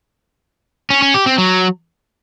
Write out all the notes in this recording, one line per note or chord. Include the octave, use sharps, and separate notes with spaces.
C#4
C#4
G4
C4
F#3